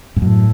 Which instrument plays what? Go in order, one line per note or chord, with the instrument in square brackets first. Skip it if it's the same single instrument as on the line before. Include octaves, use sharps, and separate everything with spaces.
[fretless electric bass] G2
[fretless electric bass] F#2 [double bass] A2